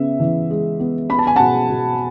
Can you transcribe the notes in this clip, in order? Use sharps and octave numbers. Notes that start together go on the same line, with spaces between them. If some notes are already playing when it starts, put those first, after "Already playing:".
Already playing: C#3 B3 E5
E3
G#3
B3
B3 B5
A5
G#5
B2 F#5 A5
B2